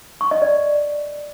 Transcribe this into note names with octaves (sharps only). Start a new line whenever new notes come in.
C#6
D#5
D5